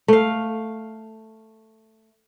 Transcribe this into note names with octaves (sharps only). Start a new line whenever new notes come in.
A3 F5